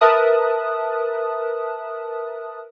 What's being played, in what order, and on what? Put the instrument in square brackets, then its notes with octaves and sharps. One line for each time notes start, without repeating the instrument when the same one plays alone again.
[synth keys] A#4 B4 E5 A5 D#6 F#6